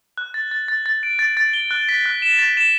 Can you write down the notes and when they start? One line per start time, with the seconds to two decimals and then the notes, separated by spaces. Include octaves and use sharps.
0.18 F#6
0.34 A6
0.51 A6
0.68 A6
0.86 A6
1.03 D7
1.19 A6
1.37 A6
1.53 G7
1.71 F#6
1.89 B6
2.06 F#6
2.22 E7
2.39 A6
2.57 E7